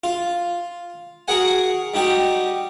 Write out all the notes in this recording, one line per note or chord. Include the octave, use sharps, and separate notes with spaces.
F4
F#4 G#4 A#4 F#5 G#5
G3 D#4 F#4 G4